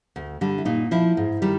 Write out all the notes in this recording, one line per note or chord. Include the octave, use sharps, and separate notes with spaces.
D2
D3 G3
E4
A#2 D#4
F3 E4
G#2
D#3 G3